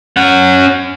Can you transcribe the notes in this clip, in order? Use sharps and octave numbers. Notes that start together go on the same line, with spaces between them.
C#4 F#5